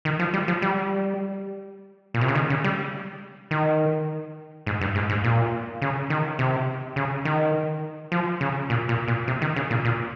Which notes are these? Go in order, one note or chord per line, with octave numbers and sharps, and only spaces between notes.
D#3
F3
G3
F3
G3
A#2
C3
C#3
D#3
C#3
G3
D#3
G#2
G2
G#2
G#2
A#2
C#3
D#3
C3
C#3
D#3
F3
C#3
A#2
A#2
A#2
C3
D#3
C#3
A#2
A#2